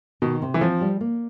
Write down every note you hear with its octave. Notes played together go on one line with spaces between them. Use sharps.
B2 D#3
C3
E3
F3 C4
G3
A#3